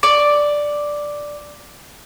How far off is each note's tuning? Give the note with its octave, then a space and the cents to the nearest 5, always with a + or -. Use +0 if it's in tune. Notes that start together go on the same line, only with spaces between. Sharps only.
D5 +0 C#6 +25